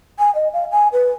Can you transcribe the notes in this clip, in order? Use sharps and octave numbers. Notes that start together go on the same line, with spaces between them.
G#5
D#5
F5
G#5
B4